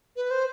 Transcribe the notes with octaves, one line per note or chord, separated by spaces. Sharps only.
B4
C5